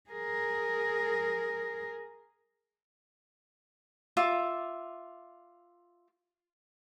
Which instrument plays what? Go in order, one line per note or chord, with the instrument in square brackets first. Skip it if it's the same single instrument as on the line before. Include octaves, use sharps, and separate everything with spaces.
[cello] G#4 A#4
[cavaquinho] F4 E5 D6